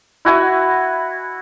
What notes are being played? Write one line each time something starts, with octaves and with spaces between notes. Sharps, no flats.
E4 F#4 G#5